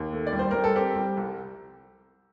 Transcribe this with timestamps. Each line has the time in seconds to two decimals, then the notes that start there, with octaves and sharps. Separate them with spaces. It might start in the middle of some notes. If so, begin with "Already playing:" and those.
Already playing: D#2
0.13 A3
0.27 D5
0.33 G3
0.39 C5
0.51 G3 A#4
0.64 A4
0.76 C4 G4
0.96 G3
1.17 C2